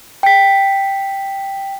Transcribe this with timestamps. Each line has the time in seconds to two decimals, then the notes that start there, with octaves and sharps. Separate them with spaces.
0.23 G5 B6